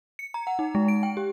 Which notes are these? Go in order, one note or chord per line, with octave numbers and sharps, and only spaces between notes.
C#7
A#5
F#5
D#4
G#3
D7
G5
G4